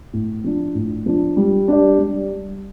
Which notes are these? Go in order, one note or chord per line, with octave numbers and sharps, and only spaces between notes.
A2
F3 D4
A2
F3 D4
G3
D4 G4 D5
G3